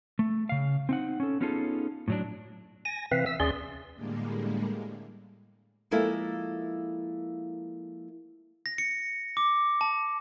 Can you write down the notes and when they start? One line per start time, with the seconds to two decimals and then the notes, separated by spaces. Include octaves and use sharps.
0.19 A3
0.49 C#3 F5
0.89 C4 D#4 F#5
1.20 C#4 A4
1.41 B3 C#4 D#4 F4 G#4 A4
2.08 A2 F#3 D4
2.85 G#5 A#6
3.12 C3 E3 C4 B4 E5 F5
3.26 E5 E6
3.40 D#2 C#4 G#4 D5 C6
3.95 A2 D3 G3 G#3 A#3
5.91 F3 G#3 A#3 E4 A4
8.66 A#6
8.78 C#7
9.37 D6
9.81 A5